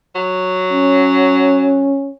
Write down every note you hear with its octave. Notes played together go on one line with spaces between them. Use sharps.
F#3
C#4